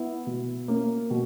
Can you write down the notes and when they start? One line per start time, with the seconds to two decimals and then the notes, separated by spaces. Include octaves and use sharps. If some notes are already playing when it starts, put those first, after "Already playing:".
Already playing: B3 E4
0.27 B2
0.68 A#3 C#4
1.10 B2